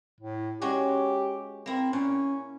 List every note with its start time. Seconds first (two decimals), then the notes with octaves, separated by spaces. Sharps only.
0.21 A2
0.62 G#3 C#4 F#4 G4
1.66 A#3 C4 E4
1.93 A#2 C#4